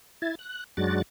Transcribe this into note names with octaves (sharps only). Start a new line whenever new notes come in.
E4 G#6 A6
F#6
F#2 F#3 G#3 D4 F#4 A6